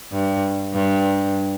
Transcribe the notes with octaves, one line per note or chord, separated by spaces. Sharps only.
G2
G2